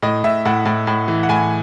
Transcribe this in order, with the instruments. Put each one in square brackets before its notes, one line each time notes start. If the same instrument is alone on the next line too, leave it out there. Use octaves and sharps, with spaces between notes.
[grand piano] A2 D#5
A2 E5
A2 F#5
A2
A2
E3
F#5
A2 G#5